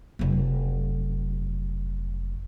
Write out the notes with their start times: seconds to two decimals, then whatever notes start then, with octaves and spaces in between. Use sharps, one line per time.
0.19 F1 F#3